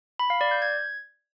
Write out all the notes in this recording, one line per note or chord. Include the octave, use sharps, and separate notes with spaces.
B5
F5
D5
G6
G#6